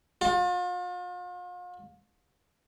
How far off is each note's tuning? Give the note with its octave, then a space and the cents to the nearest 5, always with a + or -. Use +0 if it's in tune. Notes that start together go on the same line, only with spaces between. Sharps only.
F4 +40